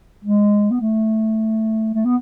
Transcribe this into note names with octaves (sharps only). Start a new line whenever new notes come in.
G#3
B3
A3
A3
B3